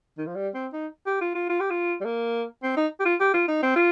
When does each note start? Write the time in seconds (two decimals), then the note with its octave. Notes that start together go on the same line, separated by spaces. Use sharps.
0.18 D#3
0.27 F3
0.36 G3
0.54 C4
0.73 D#4
1.06 G4
1.21 F4
1.35 F4
1.49 F4
1.60 G4
1.70 F4
2.01 G3
2.05 A#3
2.63 C4
2.77 D#4
3.00 G4
3.05 F4
3.20 G4
3.34 F4
3.48 D#4
3.63 C4
3.76 F4